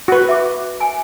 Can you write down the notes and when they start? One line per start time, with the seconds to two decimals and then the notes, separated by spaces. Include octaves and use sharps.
0.08 F#4 B4
0.29 E5 D6
0.80 G5 G#5